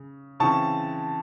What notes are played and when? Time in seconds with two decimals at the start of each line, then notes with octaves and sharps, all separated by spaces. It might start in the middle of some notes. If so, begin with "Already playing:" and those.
Already playing: C#3
0.40 C#3 E3 C4 A5 C#6